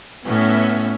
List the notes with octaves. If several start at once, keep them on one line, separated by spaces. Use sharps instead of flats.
A2 B3 C#4 E5